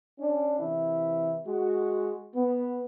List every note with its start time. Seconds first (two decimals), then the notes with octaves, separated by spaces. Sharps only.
0.19 C#4 D4
0.59 C3 E3 E4
1.46 G#3 F#4
2.34 B3